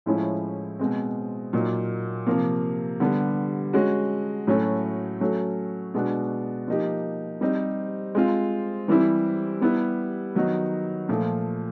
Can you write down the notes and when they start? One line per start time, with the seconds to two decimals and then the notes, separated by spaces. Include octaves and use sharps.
0.06 A2 F3 G#3 C#4 E4
0.79 B2 G#3 C4
1.53 A#2 F#3 A#3 D#4
2.26 C3 F3 A#3
3.00 D3 G3 B3
3.73 G#3 C#4 F#4
4.47 A2 F#3 A3 C#4 F#4
5.21 F#3 A3 C#4
5.94 B2 G#3 B3 D4 F#4
6.68 F3 A#3 D#4 G4
7.41 G3 C4 D#4
8.15 G#3 C4 F4
8.88 E3 G3 C4 E4
9.61 G3 B3 E4
10.35 D#3 F#3 B3 D#4
11.09 A#2 F3 A3